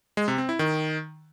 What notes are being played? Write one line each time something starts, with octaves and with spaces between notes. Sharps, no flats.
G#3
C3
C4
E4
D#3